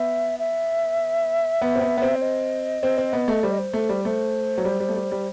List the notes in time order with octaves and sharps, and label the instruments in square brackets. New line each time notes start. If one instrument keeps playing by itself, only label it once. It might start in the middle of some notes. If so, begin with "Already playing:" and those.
Already playing: [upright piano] B3 [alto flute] E5
[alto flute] E5
[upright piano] B3
C4
B3
B3
C4
[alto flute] C5
D#5
[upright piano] C4
C4
B3
A3
[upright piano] G3 [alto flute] C5
[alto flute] D#5
C5
[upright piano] A3
G3
[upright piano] A3 [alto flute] C5
[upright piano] F#3
G3
G3
A3
G3
G3